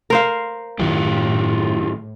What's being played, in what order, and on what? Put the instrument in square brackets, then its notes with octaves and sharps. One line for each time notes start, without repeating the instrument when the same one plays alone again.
[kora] A#4 C5 F5
[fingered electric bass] F#2 D#3 F#3 [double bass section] A2 [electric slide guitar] E4 F4 G4